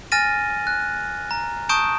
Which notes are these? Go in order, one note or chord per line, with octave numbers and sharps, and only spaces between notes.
G#5 F6 A6 A#6 D#7
F#6
A#5
A5 C#6 D#6 G6 D7 E7